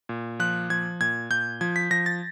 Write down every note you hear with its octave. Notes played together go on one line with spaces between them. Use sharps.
A#2
F3 F#6
F3 G#6
A#2 G#6
A#2 G6
F3 G#6
B6
F3 A#6
A6